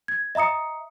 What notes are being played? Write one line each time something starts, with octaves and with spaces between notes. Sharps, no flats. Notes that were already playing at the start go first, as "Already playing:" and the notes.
G#6
D#5 E5 A#5 D#6 C#7